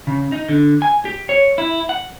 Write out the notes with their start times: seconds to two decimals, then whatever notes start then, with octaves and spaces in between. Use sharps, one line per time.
0.07 C#3
0.32 D#4
0.49 D3
0.82 G#5
1.05 G4
1.29 C#5
1.58 E4
1.89 F#5